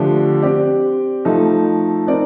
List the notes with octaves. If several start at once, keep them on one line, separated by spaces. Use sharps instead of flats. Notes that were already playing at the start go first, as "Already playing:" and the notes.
Already playing: D3 F3 A3 D4 G4
C4 G4 D5
F3 A3 D#4 A4
C4 D#4 A#4 D5